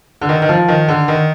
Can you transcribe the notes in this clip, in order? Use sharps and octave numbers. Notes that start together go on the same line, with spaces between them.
D3
D#3
D#3
F3
D#3
D3
D#3